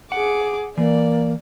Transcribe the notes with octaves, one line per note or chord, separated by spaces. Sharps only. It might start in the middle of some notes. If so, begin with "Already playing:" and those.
G#4 F#5 D6
E3 A#3 D5